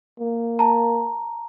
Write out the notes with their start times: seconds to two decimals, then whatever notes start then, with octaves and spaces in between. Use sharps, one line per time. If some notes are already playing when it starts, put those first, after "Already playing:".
0.20 A#3
0.59 A5 A#5